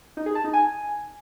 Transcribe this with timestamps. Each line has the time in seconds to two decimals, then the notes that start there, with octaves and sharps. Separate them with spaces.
0.17 D#4
0.26 G#4
0.35 A5
0.44 D#4
0.54 G#5